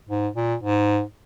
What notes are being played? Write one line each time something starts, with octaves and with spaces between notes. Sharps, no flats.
G#2
A#2
G#2